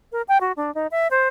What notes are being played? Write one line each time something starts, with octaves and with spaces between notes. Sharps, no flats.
A#4
G5
F#4
D4
D#4
E5
C5